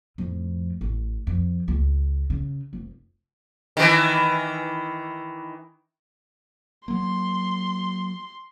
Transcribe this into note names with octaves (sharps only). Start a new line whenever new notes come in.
F2 A2
A1
F2
C#2
C#3
F1
D#3 E3
F#3 A#3 C6